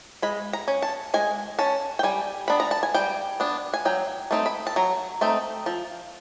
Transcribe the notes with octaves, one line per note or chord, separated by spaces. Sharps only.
G#3 B5
A#5
C#4
A5
G#3 G#5
C#4 A5
G5
G3 G#5
B3 D4 B5
A#5
A5
G#5
G3 G5
B3 D4
G#5
F#3 G5
A3 C4 D#4
B5
A5
F#3 A#5
A3 C4 D#4
F3